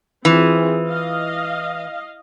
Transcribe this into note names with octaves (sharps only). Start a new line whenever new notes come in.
E3 C4 F4 G#4
D#5 F5